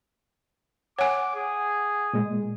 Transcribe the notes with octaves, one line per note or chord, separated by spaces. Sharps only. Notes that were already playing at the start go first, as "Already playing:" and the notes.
C#5 F#5 G#5 D6
G#4
A#2 G#3